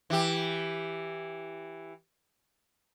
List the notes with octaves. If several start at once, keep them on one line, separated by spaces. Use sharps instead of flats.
E3 G4